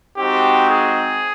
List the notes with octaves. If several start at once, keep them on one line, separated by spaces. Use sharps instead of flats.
G#3 C4 D#4 F#4 G4
G#4